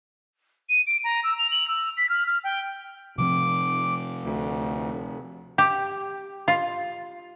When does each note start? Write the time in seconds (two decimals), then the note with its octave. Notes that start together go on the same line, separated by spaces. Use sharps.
0.69 D#7
0.87 D7
1.04 A#5
1.24 E6
1.38 F7
1.51 F#7
1.68 E6
1.97 B6
2.09 F6
2.27 F6
2.44 G5
3.18 C3 F3 C4 D6
4.24 D2
5.58 G4
6.48 F4